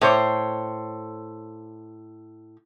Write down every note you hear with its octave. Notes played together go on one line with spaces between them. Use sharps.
A2 C5 C#5